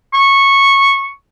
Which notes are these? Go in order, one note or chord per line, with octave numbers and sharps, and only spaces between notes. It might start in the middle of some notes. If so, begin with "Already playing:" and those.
C#6